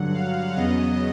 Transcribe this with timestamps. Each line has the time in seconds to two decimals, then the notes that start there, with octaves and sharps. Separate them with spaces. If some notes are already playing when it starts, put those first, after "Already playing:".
Already playing: G2 D3 F#3 F#5
0.14 F5
0.56 E2 C#3 F#3 B3 D#5